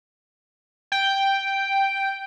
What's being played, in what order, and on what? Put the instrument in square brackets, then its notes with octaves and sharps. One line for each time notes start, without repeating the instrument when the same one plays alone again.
[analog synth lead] G5